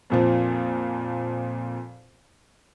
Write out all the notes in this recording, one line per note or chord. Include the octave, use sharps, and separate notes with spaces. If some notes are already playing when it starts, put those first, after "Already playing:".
F2 A#2 F3